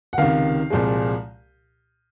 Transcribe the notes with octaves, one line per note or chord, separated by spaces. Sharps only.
F#5
C#2 C3 D#3 F5
C2 A#2 F3 G#3